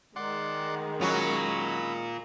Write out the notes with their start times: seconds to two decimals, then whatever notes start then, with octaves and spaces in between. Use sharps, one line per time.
0.16 D#3 G#3 D5 F#5 C6
1.01 F#3 C#4 F4 F#4 A#4 B5 D#6 E6